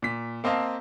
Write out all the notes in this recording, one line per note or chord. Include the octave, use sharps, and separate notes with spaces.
A#2 B6
A#3 C4 D#5 F5 A5